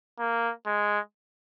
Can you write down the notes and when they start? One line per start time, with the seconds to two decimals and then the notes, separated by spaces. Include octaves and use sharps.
0.19 A#3
0.66 G#3